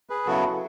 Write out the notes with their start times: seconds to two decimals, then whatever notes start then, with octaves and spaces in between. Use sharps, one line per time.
0.10 G#4 B4
0.27 C#3 F#3 B3 E4 F#4 A4